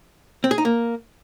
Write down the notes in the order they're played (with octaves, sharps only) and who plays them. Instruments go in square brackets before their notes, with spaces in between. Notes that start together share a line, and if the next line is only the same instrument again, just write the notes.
[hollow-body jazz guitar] C4
G#4
D#4
A#3